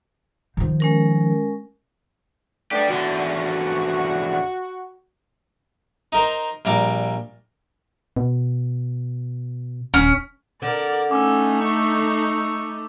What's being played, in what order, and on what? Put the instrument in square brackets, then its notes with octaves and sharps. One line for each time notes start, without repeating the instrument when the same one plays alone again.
[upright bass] D#3 F3
[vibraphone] G#3 C#4 A#4
[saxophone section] A3 B3 D4 [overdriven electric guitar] G4 D5
[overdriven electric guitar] E2 D3 [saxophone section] F#4
[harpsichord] D#4 A#4 C5
A#1 G3 A#5 D6
[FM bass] B2
[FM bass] D#1 [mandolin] C#4
[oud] D3 [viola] A#4 D5
[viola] A3 D#4 [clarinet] C#4 [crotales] D6 E6
[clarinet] C#6